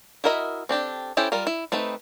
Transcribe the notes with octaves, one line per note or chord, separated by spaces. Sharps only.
E4 F#4 A#4 D#5 E5
C4 D4 G4 A4
C#4 E4 G4 A4 C5
G3 F4 A#4
E4
A3 C4 D#4 B4